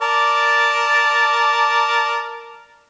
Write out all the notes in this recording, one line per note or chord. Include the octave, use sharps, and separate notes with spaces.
A#4 D5 A5